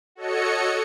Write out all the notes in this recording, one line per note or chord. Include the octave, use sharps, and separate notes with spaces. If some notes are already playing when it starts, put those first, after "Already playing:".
F#4 A4 C#5 D#5 C#7